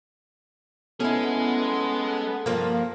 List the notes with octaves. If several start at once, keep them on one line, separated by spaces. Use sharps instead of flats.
G#3 B3 C#4 E4 G#4 A4
G2 F3 A#3